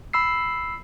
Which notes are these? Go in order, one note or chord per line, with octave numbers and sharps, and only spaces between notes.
B5 E6 C7